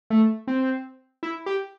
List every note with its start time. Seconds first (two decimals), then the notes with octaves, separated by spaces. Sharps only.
0.10 A3
0.47 C4
1.23 E4
1.46 G4